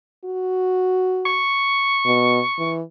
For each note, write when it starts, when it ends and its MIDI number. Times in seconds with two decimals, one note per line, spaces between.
0.25 1.43 66
1.26 2.73 85
2.06 2.40 47
2.58 2.82 52